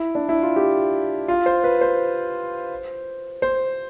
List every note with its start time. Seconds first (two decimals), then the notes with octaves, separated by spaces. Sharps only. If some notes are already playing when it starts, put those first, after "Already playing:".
Already playing: E4
0.15 D4
0.29 E4
0.42 F4
0.56 G4
1.28 F4
1.46 C5
1.64 B4
1.81 C5
3.42 C5